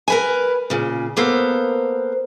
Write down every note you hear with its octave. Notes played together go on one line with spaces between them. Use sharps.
A#4 B4 G#5
A#2 C#3
A#3 B3 A4 A#4 C5